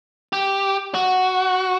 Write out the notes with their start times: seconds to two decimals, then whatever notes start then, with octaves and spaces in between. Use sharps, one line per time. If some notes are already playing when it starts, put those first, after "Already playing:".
0.33 G4
0.94 F#4